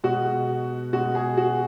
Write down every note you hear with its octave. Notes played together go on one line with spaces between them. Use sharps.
B2 G#3 F#4
B2 G#3 F#4
G#4
F#4